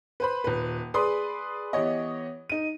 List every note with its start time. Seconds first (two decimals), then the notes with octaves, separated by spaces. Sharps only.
0.20 B4 C5 B5
0.44 D#1 B4
0.94 G#4 B4 D5 B5 C6 D#6
1.73 E3 B3 G4 C#5 D#5
2.50 D#4 D#7